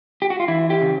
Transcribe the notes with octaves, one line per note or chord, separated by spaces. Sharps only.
G4
F#4
F4
E3 E4
G4
C#3